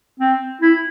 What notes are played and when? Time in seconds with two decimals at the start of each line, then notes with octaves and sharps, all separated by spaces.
0.19 C4
0.61 E4